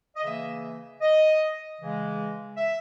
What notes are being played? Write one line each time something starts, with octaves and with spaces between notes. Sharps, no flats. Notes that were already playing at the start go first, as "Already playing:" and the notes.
D#5
C#3 E3 A#3 E5
D#5
C#3 E3 G#3
E5